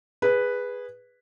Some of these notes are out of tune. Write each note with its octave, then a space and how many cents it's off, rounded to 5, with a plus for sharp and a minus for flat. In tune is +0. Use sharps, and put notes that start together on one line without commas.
G#4 -15 B4 +0